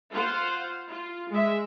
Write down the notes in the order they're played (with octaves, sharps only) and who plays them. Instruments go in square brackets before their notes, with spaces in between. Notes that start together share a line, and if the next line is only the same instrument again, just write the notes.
[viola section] F4 C5 F5 F#5
F4
G#3 E5